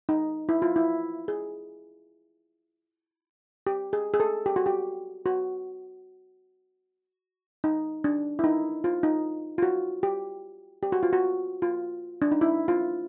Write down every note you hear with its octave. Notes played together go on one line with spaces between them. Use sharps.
D#4
E4
F4
E4
G#4
G4
G#4
G#4
A4
G4
F#4
G4
F#4
D#4
D4
E4
D#4
F4
D#4
F4
F#4
G4
G4
F#4
F4
F#4
F4
D4
D#4
E4
F4